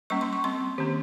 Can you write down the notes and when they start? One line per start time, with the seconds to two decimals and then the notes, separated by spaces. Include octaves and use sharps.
0.10 G3 A#3 C#4 C#6
0.21 C6
0.33 C#6
0.44 G3 C4 C6
0.78 D#3 A#3 C#4 G4